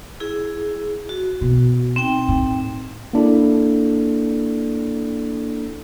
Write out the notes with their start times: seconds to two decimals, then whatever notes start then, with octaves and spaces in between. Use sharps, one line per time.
0.20 E4 G#4
1.09 F#4
1.41 B2
1.96 C4 D#4 G5
2.28 A2
3.13 A#3 D4 E4 A4